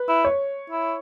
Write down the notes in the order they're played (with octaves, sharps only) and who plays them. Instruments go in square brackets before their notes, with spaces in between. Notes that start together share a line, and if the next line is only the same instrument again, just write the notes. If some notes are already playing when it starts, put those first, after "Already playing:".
Already playing: [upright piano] B4
[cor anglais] E4
[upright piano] C#5
[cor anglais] E4